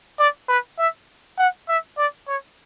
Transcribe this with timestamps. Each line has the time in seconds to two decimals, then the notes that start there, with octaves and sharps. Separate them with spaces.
0.19 D5
0.49 B4
0.79 E5
1.39 F#5
1.68 E5
1.98 D5
2.28 C#5